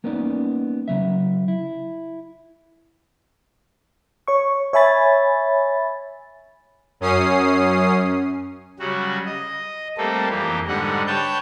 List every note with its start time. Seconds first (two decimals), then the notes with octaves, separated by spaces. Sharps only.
0.04 A#3 B3 C#4 D#4 D5
0.88 C#3 F#3 E5
1.48 E4
4.28 C#5 C#6
4.73 C#5 E5 G#5 B5 A6
7.00 F#2 C#4 D#6 C7
8.79 C#3 F#3 G3 F#4
9.25 D#5
9.97 G3 A3 A#3 C4 A4
10.30 F2 E3 A#3 G4
10.68 G#2 D3 G3 F#5
11.07 B4 C#5 G5 A5 G6